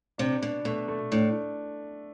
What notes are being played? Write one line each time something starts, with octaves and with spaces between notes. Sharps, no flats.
C3 D4
B2 D4
B2 A3
A3
A2 D4